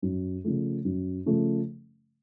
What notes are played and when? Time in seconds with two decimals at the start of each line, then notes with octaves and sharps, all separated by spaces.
0.02 F#2
0.44 C#3 F3 A3
0.85 F#2
1.26 C#3 F3 A3